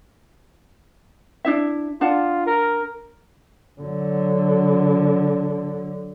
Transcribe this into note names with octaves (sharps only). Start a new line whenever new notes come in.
D4 E4 E5
D4 F4 F#5 A5
A#4
D3 F#3